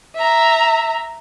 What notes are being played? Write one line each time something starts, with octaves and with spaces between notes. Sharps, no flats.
E5 A#5